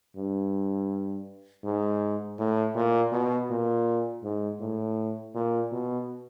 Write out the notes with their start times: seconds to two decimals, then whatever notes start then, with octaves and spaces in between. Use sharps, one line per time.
0.16 G2
1.64 G#2
2.39 A2
2.76 A#2
3.12 B2
3.50 A#2
4.24 G#2
4.60 A2
5.35 A#2
5.72 B2